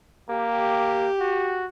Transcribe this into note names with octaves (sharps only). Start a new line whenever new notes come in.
A#3 G4
F#4